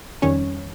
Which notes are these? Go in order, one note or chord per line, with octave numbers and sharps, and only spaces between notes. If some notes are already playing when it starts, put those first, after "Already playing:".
F2 D#3 G3 C#4 C#5